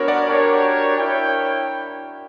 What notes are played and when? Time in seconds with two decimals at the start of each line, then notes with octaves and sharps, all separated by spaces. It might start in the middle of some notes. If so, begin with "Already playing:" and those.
Already playing: B3 D4 F#4 A#4 C#5
0.08 D5 F#5
0.26 D4 G4 A#4 C#5
0.97 E4 A#4 C#5 G5